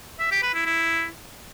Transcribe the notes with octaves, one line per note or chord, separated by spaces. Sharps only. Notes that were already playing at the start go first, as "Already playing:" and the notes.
E5
G4
B4
E4
E4